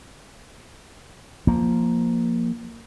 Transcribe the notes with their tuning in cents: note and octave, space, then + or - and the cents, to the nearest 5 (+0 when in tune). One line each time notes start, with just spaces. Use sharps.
F3 +0 A#3 +0